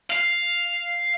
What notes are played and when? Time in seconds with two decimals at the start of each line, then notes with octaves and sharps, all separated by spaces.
0.10 F5